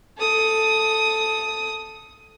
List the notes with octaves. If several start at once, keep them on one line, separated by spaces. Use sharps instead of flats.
A4 D#6